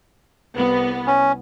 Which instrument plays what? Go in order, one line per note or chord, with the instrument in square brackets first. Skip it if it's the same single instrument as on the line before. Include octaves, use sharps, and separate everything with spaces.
[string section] C2 B3
[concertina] C#4